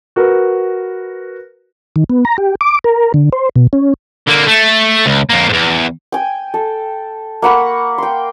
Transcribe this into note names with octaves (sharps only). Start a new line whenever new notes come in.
F#4 A#4 B4
D#3
B3
A#5
G4
D6
A#4
D3
C5
B2
C#4
D3 A#3
A3
C#2
F2 A#3
E2 G#2
G5 G#5
A4
A#3 F#5 B5 C#6
G5 C6